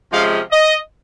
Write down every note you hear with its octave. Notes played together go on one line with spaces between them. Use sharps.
C3 F3 G#3 C#4 F5
D#5